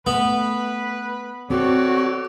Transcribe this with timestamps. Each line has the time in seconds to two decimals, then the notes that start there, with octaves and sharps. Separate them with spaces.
0.07 A3 B3 B4 B5
1.50 C4 F#4 A4 C#5 D5